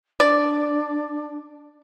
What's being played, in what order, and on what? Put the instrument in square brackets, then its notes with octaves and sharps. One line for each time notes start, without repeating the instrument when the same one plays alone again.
[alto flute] D4 [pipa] D5